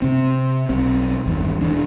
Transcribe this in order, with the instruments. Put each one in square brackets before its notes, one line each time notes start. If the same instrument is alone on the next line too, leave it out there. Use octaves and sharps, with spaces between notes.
[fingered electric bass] C3 C4
B1 C4
G#1 E2 G2
E1 E3 D4